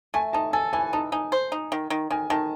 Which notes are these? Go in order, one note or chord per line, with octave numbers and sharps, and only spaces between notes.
A3 G#5
D#4 A5
A4 G#5
E3 G#5
D#4 A5
D#4 G#5
C5
D#4
D#3
D#3
D#3 G#5
D#3 A5